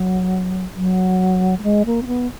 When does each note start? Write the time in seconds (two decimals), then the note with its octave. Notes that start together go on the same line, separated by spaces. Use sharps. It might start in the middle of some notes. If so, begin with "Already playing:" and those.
Already playing: F#3
0.76 F#3
1.60 A3
1.63 G#3
1.86 A#3
2.02 C4
2.07 B3